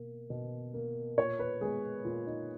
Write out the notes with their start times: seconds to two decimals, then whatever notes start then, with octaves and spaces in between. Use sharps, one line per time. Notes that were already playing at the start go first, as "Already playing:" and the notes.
Already playing: B2 A#3
0.30 B2
0.74 A#3
1.18 A#2 C#5
1.39 B4
1.61 G#3 B3 G#4
2.05 A#2 F4
2.26 D#4